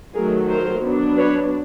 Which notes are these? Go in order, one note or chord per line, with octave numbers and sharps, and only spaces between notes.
D#3 F#3 A3 G#4 A#4
A#4 C5
F#3 B3 D4
B4 C#5